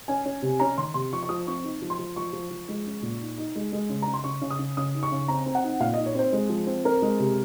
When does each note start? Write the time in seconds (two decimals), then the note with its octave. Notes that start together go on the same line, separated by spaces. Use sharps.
0.08 C#4 G#5
0.25 C#4
0.42 C3
0.60 C#4 A#5
0.78 D#3 C6
0.94 C3 C6
1.13 F3 C#6
1.23 C#6
1.29 F3 D#6
1.47 C4 C#6
1.64 D#4
1.82 F3
1.90 C6
1.99 F3
2.16 F3 C#6
2.33 F3
2.50 F3
2.69 G#3
2.86 C#4
3.02 A#2
3.21 D#4
3.38 D#4
3.56 G#3
3.73 G#3
3.89 C#3
4.02 C#3 A#5
4.14 C6
4.24 C#3 C#6
4.42 C#3
4.51 D#6
4.59 C#3
4.77 C#3 D#6
4.94 D#4
5.03 C#6
5.12 C#3
5.28 C4 A#5
5.46 C4
5.55 F#5
5.64 D#4
5.80 A#2 F5
5.94 D#4 D#5
6.06 C#5
6.15 C4 C5
6.33 G#3
6.49 F3
6.67 C4
6.84 C4 A#4
7.02 G#3
7.19 C3